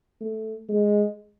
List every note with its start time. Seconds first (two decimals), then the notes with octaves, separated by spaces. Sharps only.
0.21 A3
0.69 G#3